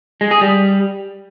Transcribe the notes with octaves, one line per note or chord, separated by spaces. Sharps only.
G#3
G#4
G3